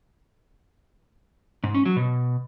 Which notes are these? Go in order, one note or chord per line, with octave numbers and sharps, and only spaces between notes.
G#2
C#4
F#3
B2